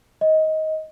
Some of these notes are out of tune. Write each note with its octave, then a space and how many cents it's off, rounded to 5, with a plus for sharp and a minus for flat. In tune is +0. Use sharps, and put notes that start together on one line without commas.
D#5 +15